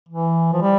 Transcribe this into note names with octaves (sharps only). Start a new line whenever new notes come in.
E3
F3
G3